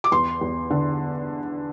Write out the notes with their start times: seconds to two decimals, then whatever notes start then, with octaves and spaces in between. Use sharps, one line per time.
0.04 D6
0.11 E2 C6
0.41 E2
0.70 D3